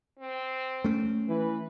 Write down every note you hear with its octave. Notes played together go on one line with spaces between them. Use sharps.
C4
A3 C#4
E3 B4